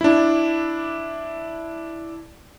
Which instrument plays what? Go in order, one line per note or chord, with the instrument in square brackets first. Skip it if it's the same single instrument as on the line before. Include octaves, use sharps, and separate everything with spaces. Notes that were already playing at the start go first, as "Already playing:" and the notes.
[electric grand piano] D4 E4